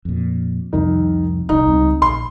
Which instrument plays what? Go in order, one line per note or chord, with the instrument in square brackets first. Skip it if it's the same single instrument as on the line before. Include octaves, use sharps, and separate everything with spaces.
[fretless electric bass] F2 A#2
[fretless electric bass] C2 F2 C3 [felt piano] D#3
[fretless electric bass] D#1 C2 [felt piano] D#4
[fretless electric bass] C#2 G3 C4
[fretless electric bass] A#1 [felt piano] C6